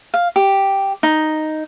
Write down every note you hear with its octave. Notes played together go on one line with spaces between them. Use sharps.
F5
G4
D#4